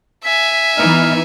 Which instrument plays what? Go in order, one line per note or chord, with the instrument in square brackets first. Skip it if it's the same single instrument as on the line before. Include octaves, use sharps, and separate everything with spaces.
[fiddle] E5 G#5 [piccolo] B6
[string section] E3 B3 D#4 [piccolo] F6